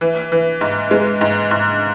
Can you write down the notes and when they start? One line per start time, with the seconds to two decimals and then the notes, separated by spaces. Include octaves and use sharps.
0.01 E3
0.32 E3
0.61 G#2
0.91 G#3
1.21 G#2
1.51 G#2